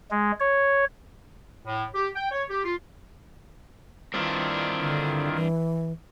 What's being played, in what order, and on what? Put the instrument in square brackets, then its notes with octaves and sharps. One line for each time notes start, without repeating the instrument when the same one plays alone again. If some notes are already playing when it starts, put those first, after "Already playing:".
[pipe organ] G#3
C#5
[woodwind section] A2
G4
G5
C#5
G4
F4
[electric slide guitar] G2 C4 D4 [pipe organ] D#3 E4 F4
[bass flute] D3
E3